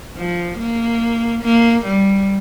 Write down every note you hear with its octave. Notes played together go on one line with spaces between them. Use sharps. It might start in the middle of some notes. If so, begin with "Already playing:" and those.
F3
A#3
A#3
G3